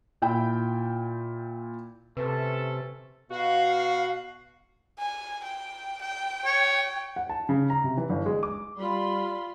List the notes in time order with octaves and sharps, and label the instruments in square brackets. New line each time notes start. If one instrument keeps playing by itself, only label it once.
[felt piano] A#2 E4 G5
[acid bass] C3 [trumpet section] A3 C#4 A4 [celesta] B4
[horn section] B2 F#4 [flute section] F5
[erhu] G#5
G5
G5
[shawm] C#5
[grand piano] F#5
A5
C#3
A#5
C3
E3
G1
G#3
D6
[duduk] G3 [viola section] F4 B5 C6